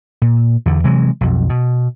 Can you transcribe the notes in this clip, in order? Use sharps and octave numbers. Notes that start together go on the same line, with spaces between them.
A#2
E2 D3
C3 E3 F#3 G#3
B1 F2
B2